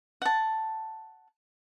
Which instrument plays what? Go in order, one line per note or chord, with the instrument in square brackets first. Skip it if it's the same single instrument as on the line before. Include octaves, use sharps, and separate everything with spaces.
[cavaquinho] F#5 A5